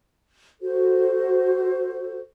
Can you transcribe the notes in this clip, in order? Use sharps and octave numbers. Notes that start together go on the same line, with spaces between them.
F#4 A4 C5